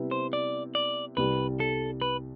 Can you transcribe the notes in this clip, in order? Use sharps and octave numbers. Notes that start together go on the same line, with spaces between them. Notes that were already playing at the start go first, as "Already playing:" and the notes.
Already playing: C3 G3 B3 E4
C5
D5
D5
C2 C3 G3 B4
A4
B4